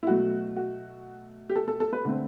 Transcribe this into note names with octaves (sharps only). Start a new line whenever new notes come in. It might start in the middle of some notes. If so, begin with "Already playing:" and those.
E4
B2 F#3 A3 F#4
F#4
G4
A4
A4
A4
B4
D3 A3 C4